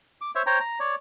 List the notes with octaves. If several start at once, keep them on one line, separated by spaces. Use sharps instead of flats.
D6
C5 C#5 E5
C5 C#5 G5 A#5
A#5
C#5 D5